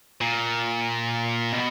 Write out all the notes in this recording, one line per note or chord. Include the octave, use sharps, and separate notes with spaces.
A#2
B2